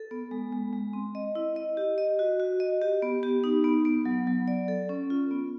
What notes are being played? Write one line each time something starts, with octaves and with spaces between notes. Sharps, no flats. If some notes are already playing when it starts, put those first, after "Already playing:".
Already playing: A4
B3
G#3
G#3
G#3
C4
D#5
E4
D#5
G4
D#5
F#4
F#4
D#5
G4
B3
G4
D#4
B3
B3
F#3
F#3
D5
A4
C#4
F4
B3